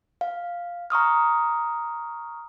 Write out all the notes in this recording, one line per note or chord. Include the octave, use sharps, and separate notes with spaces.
F5
A#5 C#6 D#6 F6